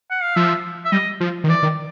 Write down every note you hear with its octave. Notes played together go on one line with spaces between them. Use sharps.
F#5
F5
F3 E5
E5
G3 D#5
F3
D#3
E3 D5
D#3